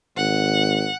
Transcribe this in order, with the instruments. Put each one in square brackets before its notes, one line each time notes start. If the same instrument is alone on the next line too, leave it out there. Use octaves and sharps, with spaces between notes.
[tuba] G#1 [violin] F#5